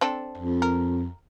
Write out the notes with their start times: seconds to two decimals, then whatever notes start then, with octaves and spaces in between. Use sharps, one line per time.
0.01 C4 D4 A4
0.38 F2
0.62 A#4